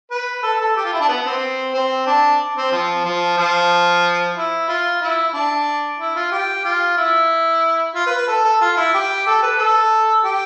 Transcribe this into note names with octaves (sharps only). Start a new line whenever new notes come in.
B4
A4
A4
G4
F4
E4
D4
B3
C4
C4
D4
C4
F3
F3
F3
E4
F4
E4
E4
D4
E4
F4
G4
F4
E4
F4
B4
B4
A4
A4
F4
E4
G4
A4
B4
A4
G4